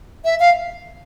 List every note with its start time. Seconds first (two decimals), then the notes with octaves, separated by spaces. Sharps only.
0.25 E5
0.40 F5